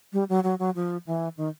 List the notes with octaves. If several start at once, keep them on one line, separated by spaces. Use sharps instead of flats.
G3
F#3
F#3
F#3
F3
E3
D#3